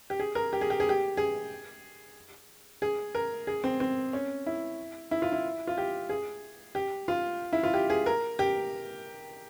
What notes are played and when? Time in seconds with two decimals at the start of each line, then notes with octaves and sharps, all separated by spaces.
0.10 G4
0.19 G#4
0.35 A#4
0.53 G4
0.61 G#4
0.70 G4
0.80 G#4
0.89 G4
1.17 G#4
2.82 G#4
3.15 A#4
3.47 G#4
3.64 C4
3.80 C4
4.13 C#4
4.46 E4
5.11 E4
5.22 F4
5.32 E4
5.67 F4
5.78 G4
6.09 G#4
6.75 G4
7.08 F4
7.53 E4
7.63 F4
7.74 G4
7.90 G#4
8.06 A#4
8.39 G4